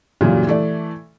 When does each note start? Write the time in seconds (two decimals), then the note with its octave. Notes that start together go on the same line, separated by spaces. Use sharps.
0.21 F#2 A#2 C#3 E3 F#3 G3
0.47 E3 A3 D5